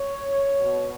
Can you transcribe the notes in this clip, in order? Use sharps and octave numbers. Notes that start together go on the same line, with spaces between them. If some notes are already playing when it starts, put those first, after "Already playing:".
Already playing: C#5
B2